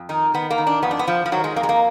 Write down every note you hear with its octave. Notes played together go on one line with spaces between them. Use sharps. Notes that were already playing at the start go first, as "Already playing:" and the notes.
Already playing: F2
D#3 D#4
D#3 B3
A#3
D#3
D4
F2 B3
D4
B3
F2 F3
F3
D#3 F#3
G#3
F2 A#3
G#3
A#3